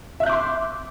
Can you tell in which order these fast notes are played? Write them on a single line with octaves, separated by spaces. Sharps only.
E5 F#6 G6 D6 C6